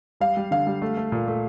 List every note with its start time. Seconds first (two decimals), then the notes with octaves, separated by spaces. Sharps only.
0.20 G3 F5
0.37 G3
0.51 D3 F5
0.67 G3
0.82 A3
0.97 A3
1.12 A#2
1.28 A3